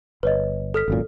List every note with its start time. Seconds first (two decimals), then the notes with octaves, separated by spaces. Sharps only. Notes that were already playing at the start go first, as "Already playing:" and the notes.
0.23 G1 B4 C#5 D#5
0.74 A4 F6 B6
0.88 G#1 F#2 A#2